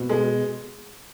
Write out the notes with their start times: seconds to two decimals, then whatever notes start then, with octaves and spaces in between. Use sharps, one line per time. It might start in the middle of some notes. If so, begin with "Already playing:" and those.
Already playing: B2
0.10 G#3